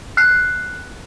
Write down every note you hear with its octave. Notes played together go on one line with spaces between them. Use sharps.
F6 F#6 C7